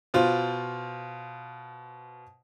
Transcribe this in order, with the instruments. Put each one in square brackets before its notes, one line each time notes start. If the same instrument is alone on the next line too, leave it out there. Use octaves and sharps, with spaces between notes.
[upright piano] B2 F4 C5